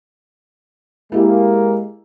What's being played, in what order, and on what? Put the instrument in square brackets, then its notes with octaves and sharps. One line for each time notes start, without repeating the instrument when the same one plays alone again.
[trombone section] G#3 A#3 [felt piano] E4 G4